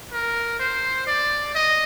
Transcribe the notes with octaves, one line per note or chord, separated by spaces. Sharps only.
A#4
C5
D5
D#5